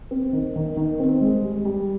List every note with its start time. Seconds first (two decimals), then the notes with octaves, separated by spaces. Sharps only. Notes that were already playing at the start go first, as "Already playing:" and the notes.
0.11 C4
0.33 D#3
0.56 D#3
0.77 D#3
1.00 C4
1.21 G#3
1.44 G3
1.65 G3